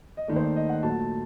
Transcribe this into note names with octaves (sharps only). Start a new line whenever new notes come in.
D#5
D#2 D#3 A3 D5
C5
D5
D#5
F#5
A#2 F#3 A3 A5